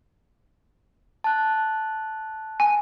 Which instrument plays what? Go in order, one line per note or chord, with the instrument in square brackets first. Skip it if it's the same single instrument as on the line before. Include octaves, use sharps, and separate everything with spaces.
[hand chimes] A5 F#6
[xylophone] G#5